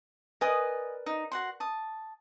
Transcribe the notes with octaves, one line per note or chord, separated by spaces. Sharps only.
A#4 B4 D5 D#5 G#5 D#6
D#4
F#4 F#5 C6
A5 D#6